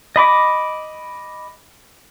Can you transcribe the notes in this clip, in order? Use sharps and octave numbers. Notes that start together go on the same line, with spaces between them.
D#5 B5 D6